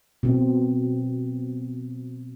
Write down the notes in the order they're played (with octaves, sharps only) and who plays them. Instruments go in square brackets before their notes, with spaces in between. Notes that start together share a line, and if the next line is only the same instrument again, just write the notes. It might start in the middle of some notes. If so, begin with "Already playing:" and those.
[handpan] B2 C4